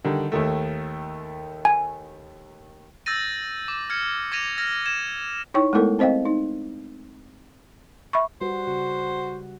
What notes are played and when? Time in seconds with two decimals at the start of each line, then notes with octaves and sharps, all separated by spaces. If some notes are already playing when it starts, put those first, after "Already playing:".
0.04 D3 D#3 G3
0.32 D#2 D#3 A3
1.65 G#5
3.06 E6 G6 A6 A#6 D#7
3.68 D6
3.90 F6 G#6 C#7
4.32 D6 G#6 A#6 D#7 F7
4.58 F6 G#6 A#6
4.86 G#6 E7
5.54 D#4 E4 C#5 G5 C#6
5.73 G#3 A3 B3 E4 A4 A#4
5.99 C4 C5 D#5 F5 G5
6.25 D#4
8.13 E5 B5 C#6
8.41 G3 F#4 B4 C5
8.67 C#3 F#4